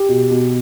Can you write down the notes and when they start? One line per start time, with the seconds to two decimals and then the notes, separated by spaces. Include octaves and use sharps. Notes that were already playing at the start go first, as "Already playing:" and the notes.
Already playing: G4
0.09 B2
0.31 B2